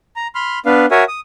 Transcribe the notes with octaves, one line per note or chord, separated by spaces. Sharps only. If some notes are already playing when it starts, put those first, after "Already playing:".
A#5
B5 C6 F6
B3 D4 B4 F5
F#4 A#4 C#5 E5 G#5
D#6